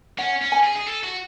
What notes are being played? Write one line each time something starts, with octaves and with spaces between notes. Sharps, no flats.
C#4 F#5
C#4
G#5
G#4
G#4
A4
F#4